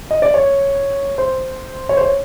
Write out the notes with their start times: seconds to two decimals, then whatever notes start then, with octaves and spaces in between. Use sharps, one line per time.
0.11 D#5
0.22 D5
0.34 C#5
1.18 C5
1.89 C#5
1.97 C5
2.01 C#5